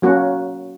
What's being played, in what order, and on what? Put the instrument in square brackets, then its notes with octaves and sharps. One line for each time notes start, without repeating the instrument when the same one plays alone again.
[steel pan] F#3 A#3 C#4 F#4